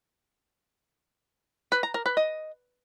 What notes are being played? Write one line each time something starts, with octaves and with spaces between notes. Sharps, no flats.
B4
A#5
A#4
B4
D#5